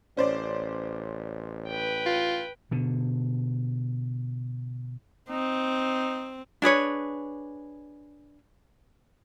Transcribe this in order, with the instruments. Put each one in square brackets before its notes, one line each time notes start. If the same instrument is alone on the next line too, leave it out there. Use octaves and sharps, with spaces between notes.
[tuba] A1 [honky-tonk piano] C#4 C5 D5
[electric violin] B4 G5
[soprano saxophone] F4
[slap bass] B2 D3
[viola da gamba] C4 [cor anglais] D#4
[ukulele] D4 G#4 B4 C#5